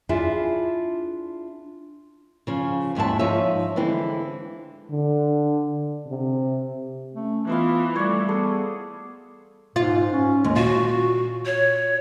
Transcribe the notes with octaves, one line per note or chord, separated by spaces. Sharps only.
D4 E4 F4 G#4 D5 E5
C#3 F3
D#2 G#2 G#3 E4 A5
F3 D#4 C#5 E5
D3 E3 G#3 C4 E4
D3
C3
A3 C#4
E3 B3 F4 B4 C5 F5
G3 A3 C#5 D5
B3 G#4 A4 C5
G#2 F4
C#4
D#2 G#3
A#2 F4 F#4
C#5